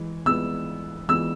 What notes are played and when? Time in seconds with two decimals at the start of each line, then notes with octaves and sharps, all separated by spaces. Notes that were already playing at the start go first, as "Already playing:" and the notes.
Already playing: E3 G#3
0.26 E3 G#3 B3 E6
1.09 E3 G#3 B3 E6